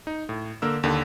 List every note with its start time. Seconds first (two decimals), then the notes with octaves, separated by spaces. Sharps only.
0.07 D#4
0.29 A2
0.62 D3 A#3 A#4 E6
0.83 D#2 D3